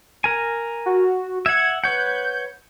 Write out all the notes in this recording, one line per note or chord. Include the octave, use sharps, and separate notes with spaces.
A#4 G#5
F#4
E5 F#5 G#6
B4 C#5 F#5 G6